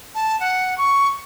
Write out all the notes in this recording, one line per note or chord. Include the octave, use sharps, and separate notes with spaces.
A5
F#5
C#6